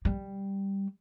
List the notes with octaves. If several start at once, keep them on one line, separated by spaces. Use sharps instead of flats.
G3